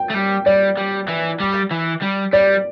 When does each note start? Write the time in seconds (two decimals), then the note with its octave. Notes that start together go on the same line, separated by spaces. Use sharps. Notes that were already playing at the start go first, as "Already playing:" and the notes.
Already playing: G5
0.10 A3
0.14 G3
0.46 G3 D5
0.77 G3
1.08 E3
1.40 G3
1.71 E3
2.01 G3
2.33 G3 D5